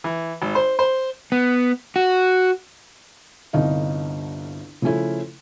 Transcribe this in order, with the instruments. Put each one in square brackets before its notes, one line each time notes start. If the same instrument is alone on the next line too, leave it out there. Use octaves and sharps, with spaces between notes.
[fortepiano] E3
G#1
C5
C5
[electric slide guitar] B3
F#4
[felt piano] G1 C2 D3 D#4 F5
C#3 F3 A3 C#4 E4